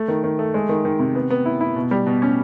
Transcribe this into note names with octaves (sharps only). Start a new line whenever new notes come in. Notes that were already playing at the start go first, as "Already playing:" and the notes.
Already playing: A3
D#3
D#3
A3
G#3
D#3
D#3
C3
B3
B3
E4
E4
B2
G3
B2
C#4